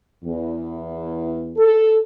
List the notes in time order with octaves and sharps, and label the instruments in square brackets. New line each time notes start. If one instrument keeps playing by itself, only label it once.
[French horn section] E2
A4